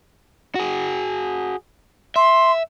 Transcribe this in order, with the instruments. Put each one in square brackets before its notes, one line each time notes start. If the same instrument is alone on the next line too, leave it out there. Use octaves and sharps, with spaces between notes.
[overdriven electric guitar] F#4 G#4
[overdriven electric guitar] E5 [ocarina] C6